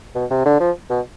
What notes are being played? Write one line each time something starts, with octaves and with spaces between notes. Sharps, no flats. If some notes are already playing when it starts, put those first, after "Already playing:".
B2
C3
D3
F3
B2